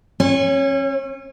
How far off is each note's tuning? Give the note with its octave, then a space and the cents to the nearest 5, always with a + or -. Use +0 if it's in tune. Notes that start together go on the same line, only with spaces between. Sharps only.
C#4 -35 C#5 +0